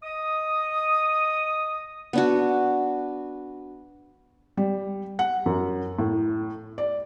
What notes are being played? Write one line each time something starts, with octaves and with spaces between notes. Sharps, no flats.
D#5 D#6
B3 D4 F#4
G3
F#5
F#2
A2
D5